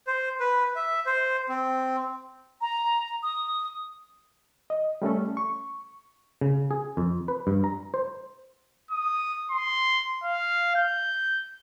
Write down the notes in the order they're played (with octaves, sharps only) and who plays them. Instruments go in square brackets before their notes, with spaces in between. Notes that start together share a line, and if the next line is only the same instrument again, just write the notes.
[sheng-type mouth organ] C5
B4
E5
C5
C4
[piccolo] A#5
D#6
[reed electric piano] D#5
G3 A3 C#4 A4
C#6
[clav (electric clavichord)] C#3
G#4
F2
B4
G2
A#5
C5
[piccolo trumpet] D#6
C6
F5
G6